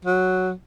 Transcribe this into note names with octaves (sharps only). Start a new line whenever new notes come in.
F#3